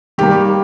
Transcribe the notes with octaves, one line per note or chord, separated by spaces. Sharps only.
D#3 G3 A#3 G4